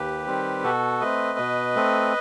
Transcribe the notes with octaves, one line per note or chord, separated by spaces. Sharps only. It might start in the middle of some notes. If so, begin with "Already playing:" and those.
Already playing: D#2 G4 B4
D#3 G3 C4
B2 F#4 A4
A3 C4 B4 D#5
B2
A3 C4